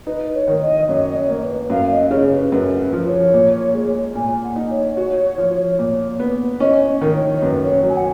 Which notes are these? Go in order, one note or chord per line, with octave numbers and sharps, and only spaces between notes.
D#4 B4
C#5
D#3
D#5
F#2 C#5
D#5
C#5
A#3
B4
F#2 F5
D#5
C#3 C#5
B4
F#2 B4
B4
F3
C#5
A#2
G#3
A#2 G#5
F#5
D#4
C#5
F#4
F3
A#2
B3
C#4 D#5
D#3
C#5
F#2 B4
C#5
F#3
G#5
F#5